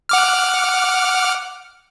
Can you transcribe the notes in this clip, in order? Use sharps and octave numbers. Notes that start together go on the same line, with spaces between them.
F#5 D6 F6